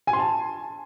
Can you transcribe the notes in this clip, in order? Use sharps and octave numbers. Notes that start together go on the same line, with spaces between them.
G#5
C6
A5